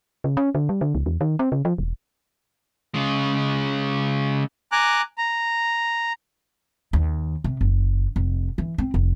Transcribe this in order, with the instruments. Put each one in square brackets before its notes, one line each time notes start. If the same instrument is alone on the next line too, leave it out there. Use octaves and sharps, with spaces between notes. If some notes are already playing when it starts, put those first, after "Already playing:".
[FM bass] C#3
C#4
D3
G3
D3
C#2
E2
D#3
C4
C#3
F3
E1
[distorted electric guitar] C#3 G#3
[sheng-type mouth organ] G#5 A#5 D6 F#6
A#5
[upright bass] D#2
C3
F#1
F1
E3
C4
F1